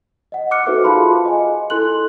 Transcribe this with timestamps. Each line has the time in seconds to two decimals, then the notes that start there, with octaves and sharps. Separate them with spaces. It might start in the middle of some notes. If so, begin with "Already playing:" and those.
0.32 D#5 F#5
0.51 D6 F6 F#6 C#7
0.66 D#4 F#4 A4 B4 C5 E5
0.84 F4 G#4 F5 A5 B5 C6
1.25 D#5 G#5
1.70 E4 A4 C6 F#6 F#7